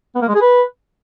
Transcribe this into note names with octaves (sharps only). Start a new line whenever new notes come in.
B3
A#3
G#3
G#4
B4